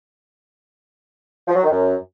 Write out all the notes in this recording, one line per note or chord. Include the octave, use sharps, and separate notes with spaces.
F3
F#3
D#3
F#2